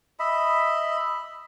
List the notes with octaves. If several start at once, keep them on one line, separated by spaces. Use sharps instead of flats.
D#5 E5 B5